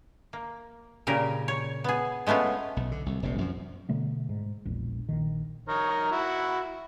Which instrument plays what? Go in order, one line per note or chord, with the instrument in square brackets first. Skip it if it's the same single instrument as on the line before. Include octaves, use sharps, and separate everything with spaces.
[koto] A#3
A#2 C#3 G4 A#4
C#5
B3 G#4
G#3 A3 B3 C#4 F4
[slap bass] B1
D3
C2
F1 A#1 C3
F#2 C3 F3
[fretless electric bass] B2 D3 A3 B3
G#2
E1 A#1
A#1 D#3
[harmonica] D#4 A#4 C#5
E4 F#4